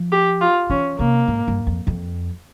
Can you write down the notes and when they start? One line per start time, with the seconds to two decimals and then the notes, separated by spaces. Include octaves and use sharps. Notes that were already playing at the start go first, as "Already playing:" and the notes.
Already playing: F3
0.12 G4
0.41 F4
0.70 E3 C#4
0.98 C3 A#3
1.28 G#2
1.48 G2
1.67 F2
1.87 F2